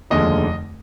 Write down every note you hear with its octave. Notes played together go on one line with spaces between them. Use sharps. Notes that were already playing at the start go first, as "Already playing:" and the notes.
F1 D#2 D3 F3 G#3 D#5